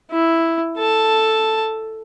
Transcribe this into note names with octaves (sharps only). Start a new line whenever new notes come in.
E4
A4 A5